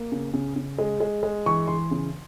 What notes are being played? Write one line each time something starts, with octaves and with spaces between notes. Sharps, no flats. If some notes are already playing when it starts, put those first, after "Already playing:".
Already playing: A#3
C#3
C#3
C#3
G#3
G#3
G#3
E3 C#6
E3 C6
C#3